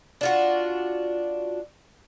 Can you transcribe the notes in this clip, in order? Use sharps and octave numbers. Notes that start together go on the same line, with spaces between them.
D4 F4 F#4